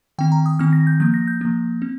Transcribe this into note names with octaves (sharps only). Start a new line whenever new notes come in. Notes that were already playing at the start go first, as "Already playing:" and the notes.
D#3 C4 G5
A#5
D#6
D#3 C4 F6
A#6
G6
F3 A#3 G6
A#6
G6
F3 A#3
C4